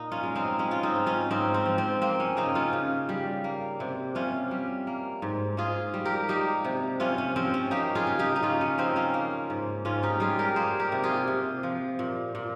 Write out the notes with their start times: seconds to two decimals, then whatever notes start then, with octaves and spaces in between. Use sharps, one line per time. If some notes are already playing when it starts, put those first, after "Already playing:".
Already playing: A#2 D#4
0.12 C#4 F4
0.23 G#3
0.35 C4 D#4
0.59 G#3 C#4
0.71 F4
0.83 C4 D#4
0.95 G#2
1.06 C#4 F4
1.31 G#2 C4 D#4
1.54 C4
1.66 F3
1.78 C4
2.02 A#3 C4
2.20 C#4
2.37 C#3 C4 D#4
2.55 C#4 F4
2.73 C#3
3.09 G3
3.44 A#3
3.80 C3
4.15 C3 C#4 F4
4.51 G3
4.87 A#3
5.22 G#2
5.57 G#2 F4 G#4
5.94 G3
6.05 G4 A#4
6.28 A#3 D#4 G4
6.65 C3
7.00 C3 C#4 F4
7.18 C#4
7.36 F3 C4
7.54 C#4
7.71 A#3 D#4 G4
7.95 F4 G#4
8.07 C#3
8.19 D#4 G4
8.36 D#4
8.42 C#3 C#4 F4
8.61 C#4
8.78 F3 C4 D#4
8.96 C#4 F4
9.14 A#3
9.50 G#2
9.85 G#2 C#4 F4
10.03 D#4 G4
10.20 G3 F4 G#4
10.39 G4 A#4
10.56 A#3 G#4 C5
10.80 G4 A#4
10.92 C3
11.04 F4 G#4
11.28 C3
11.63 F3
11.99 A#2
12.35 A#2